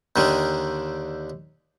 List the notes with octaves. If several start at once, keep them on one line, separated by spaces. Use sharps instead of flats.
D#2 D3 D#3